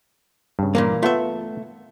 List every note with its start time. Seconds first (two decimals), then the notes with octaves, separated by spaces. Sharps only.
0.59 G2 C#3
0.75 A#2 E3 A#3
1.03 A3 B3 F4 E5